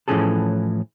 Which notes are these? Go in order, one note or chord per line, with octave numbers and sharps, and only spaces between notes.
A2 E3 F3 C#4 G#4 A4